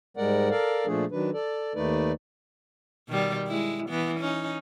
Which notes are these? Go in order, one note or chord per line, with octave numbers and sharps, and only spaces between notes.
G#2 G3 G#3 A#4 D5 F#5
A4 A#4 D5 F5
A#2 F3 A3 D4 G#4
D#3 F#3 D4 B4
A4 D5
D#2 D#3 A3 D#4 B4 D5
B2 D#3 G3
G#3 E4
E3 B3
C#4 D#4